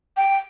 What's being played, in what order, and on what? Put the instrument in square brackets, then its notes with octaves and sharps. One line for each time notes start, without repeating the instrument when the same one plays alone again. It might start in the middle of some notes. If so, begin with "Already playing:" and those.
[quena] G5